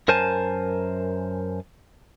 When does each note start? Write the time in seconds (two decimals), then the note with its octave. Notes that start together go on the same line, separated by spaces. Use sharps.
0.08 F#2 A#4 C5 G#5 A5